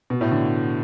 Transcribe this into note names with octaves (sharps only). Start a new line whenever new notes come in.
B2
A2
D3